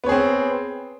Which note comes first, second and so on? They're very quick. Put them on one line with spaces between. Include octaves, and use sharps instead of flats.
B3 C#5 G#4 C4